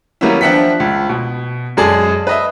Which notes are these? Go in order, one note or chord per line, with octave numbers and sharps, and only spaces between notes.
F#3 G3 A#3 B3 C#4 E4
F3 D4 E5 F#5 G5 B6
C#2
B2
F#2 G#3 G#4 D5 A5
B4 D#5 E5